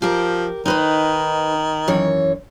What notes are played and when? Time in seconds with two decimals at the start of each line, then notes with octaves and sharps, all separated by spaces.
0.02 F3 G4 A#4
0.66 D#3 D#4 B4 C5
1.88 F#2 E3 C#5